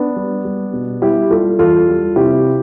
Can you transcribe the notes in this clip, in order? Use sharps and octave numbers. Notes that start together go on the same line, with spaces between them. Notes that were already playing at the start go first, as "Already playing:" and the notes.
Already playing: B3 D4
G3
G3
B2
G3 E4 G4
G3 F4 A4
E2 F4 A4
G3
C3 E4 G4